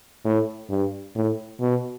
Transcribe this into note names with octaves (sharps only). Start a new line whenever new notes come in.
A2
G2
A2
B2